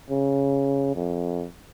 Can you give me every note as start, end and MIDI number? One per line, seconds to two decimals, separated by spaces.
0.10 0.90 49
0.95 1.46 41